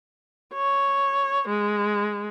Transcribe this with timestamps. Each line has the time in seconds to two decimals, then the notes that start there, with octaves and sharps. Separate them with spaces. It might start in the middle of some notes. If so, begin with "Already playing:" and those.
0.54 C#5
1.49 G#3